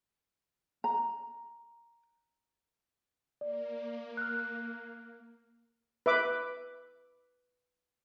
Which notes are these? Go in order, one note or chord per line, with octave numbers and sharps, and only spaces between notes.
A#5
A#3 D5
F6 F#6
B4 E5 D6